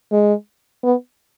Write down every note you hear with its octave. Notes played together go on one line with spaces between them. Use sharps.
G#3
B3